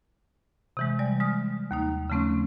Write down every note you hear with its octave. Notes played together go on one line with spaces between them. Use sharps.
C3 E3 G#3
G3 D5 G#5
G#3 D#6 F6
D#2 A#3 D#4
C#3 F3 A3 C4 C#4